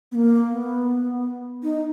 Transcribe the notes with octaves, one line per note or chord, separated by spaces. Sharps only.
B3
A#3
B3
D#4